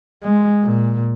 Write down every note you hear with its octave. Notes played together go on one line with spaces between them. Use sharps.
G#3
A#2